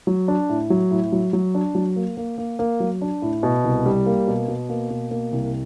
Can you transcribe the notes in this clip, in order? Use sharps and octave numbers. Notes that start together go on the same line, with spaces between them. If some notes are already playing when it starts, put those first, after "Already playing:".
F#3
D4
A2
F#3
A2
F#3
F#3
D4
F#3
A#3
A#3
A#3
A#3
F#3
D4
A2
B2
C2
G3
A#3
B2
B2
A#3
B2
A#3
C2